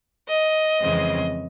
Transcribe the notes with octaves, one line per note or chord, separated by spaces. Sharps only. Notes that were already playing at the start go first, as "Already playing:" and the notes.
D#5
F2 C#3 E3 G#3 C4